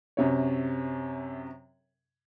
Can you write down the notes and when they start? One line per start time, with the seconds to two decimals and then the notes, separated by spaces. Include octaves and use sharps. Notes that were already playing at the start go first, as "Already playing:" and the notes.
0.17 F#2 C3 C#5